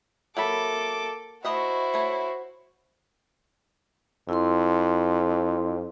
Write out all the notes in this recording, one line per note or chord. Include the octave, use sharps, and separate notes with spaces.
F#3 A#3 A4 E5 B5 D6
A3 E4 F#4 C5 D#5 E5
A3 C#5
F2 E4 C6